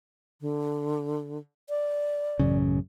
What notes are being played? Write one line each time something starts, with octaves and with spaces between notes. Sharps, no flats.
D3
D5
A1 F#2 C#3